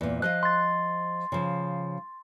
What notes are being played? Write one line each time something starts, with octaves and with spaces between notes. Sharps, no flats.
E2 A#2
F3 D#5 F5 F#6
C6 A6
C#3 F3